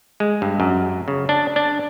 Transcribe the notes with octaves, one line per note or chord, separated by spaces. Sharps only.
G#3
G2
F#2
C#3
D4
D4